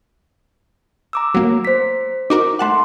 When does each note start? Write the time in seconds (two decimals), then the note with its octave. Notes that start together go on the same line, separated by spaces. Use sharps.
1.13 A#5 D6 E6
1.34 F#3 A#3
1.65 C5 B6
2.30 D#4 F#4 A#4 D6
2.59 A3 F#5 A5 C6 F#6